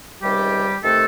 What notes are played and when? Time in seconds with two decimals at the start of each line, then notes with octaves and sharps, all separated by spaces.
0.22 C#2 C3 D#3 G3 G4
0.83 C3 D#3 A3 A4